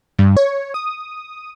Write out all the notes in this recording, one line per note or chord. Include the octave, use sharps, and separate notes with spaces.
G2
C#5
D#6